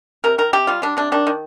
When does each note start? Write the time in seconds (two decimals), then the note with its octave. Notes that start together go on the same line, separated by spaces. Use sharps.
0.24 C3 A#4
0.38 D#3 A#4
0.53 C3 G4
0.67 G3 F4
0.82 G3 D4
0.97 C3 D4
1.12 D#3 D4
1.27 D#3